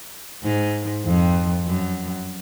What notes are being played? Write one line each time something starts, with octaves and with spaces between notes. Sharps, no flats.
G#2
F2
F#2